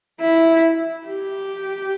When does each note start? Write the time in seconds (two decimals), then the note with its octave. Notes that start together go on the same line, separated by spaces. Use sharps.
0.20 E4
1.07 G4